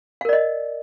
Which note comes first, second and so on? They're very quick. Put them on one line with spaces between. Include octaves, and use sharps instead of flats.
F5 A#4 D5 D#5